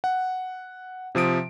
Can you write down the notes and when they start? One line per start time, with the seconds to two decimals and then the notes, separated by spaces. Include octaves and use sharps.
0.04 F#5
1.15 C3 F3 D#6 D7